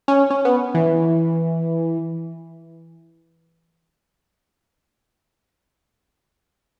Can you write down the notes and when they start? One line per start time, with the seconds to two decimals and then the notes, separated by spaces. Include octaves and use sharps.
0.08 C#4
0.30 C#4
0.45 B3
0.74 E3